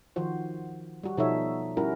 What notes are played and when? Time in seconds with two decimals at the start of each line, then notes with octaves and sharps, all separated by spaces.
0.16 D#3 F3 F#4 C5
1.03 G3 F#4
1.17 B2 F3 D#4 A4 C#5 E5
1.77 G3 C#4 E4 F#4 A#4